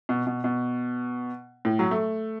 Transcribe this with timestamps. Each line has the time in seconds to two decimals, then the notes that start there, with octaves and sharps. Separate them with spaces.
0.09 B2
0.27 B2
0.44 B2
1.65 A2
1.79 F#3
1.91 A3